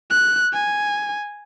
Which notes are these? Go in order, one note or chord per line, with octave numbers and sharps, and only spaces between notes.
F#6
G#5